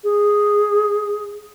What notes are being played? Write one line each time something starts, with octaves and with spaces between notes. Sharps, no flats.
G#4